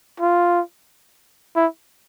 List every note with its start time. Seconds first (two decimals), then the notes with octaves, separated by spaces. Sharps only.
0.20 F4
1.56 E4